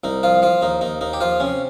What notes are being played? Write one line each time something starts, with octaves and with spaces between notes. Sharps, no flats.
C2 D#4
F3 F4
F3 F4
D#2 D#4
D#2 D#4
D#2 D#4
G4
F3 F4
C3 C#4